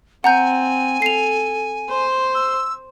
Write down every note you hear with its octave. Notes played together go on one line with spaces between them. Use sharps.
C4 F#5 G#5 A#5 G6
A4 C7 F7
C5 C6
E6